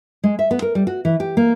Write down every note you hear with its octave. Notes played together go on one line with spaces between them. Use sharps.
G#3
E5
B3
A#4
G3
F#4
E3
G4
A#3